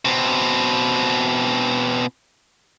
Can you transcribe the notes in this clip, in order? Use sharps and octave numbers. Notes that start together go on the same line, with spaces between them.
B2 C4